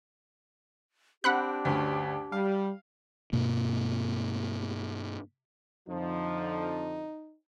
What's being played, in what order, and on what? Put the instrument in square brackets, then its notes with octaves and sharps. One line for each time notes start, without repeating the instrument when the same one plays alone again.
[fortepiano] C4 [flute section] D4 G4 [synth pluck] F#5 B5 F#6
[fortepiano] D2 G2 C#4
[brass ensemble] G3 [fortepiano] F5
[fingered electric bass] G2 B2 A#3
[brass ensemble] F2 D3 F3 [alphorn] D#4